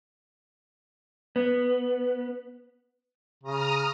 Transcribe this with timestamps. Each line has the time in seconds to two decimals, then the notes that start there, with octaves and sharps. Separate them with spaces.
1.36 B3
3.44 C#3 A#5 D#6 F6